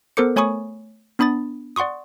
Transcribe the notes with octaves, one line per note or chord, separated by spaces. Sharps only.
B3 A4 A#4 C5 D6 C#7
A3 C#5 G#5 B5 C#6 D#6
B3 D4 B5 D#6 A6
D5 F#5 C6 C#6 D#6